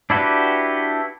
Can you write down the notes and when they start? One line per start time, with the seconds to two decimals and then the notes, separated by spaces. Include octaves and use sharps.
0.10 D4 E4 F#4 G4 B4